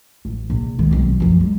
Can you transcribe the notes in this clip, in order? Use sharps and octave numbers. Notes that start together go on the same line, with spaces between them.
A1
A#1 C3
C#2 D#3
B1 C4
F#2 F3
G3 G#3